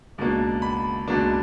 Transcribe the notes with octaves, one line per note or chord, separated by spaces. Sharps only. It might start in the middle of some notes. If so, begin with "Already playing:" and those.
C#2 B2 A#3 D4
B5
C#2 B2 A#3 D4